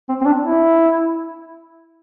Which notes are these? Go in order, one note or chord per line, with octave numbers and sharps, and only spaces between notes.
C4
C4
D4
E4